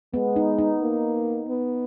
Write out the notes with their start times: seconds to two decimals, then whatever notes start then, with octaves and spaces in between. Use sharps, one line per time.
0.14 G#3 B3
0.36 D#4
0.58 D#4
0.82 A#3
1.48 B3